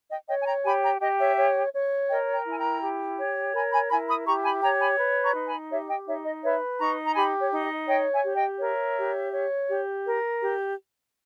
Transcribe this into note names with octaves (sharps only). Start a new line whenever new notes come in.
D#5 G5
C#5 D#5 G5
G#5
G5 A#5
G4 G#5 B5
G5 A#5
G4 D#5
C#5 E5
C#5
C#5
A#4 D#5 G5
G5 A#5
E4
G#5
G5 A#5
G4
C#5
A#4 G#5 B5
G#5 B5
E4 G#5 B5
B5 D#6
G4 A#5 C#6
G#5 B5
C#5 G5 A#5
G#5 B5
B4
A#5 C#6
D#4
G#5 B5
G4 C#5 E5
D#5 G5
D#4 C#5 E5
D#5
B4 C#5 E5
D#4 A#5 C#6
A#5
G4 G#5 B5
C#5
D#4
D#5
C#5 D#5 G5
E5 G#5
G4
D#5 G5
A#4 C#5 E5
G4
C#5
G4
A#4
G4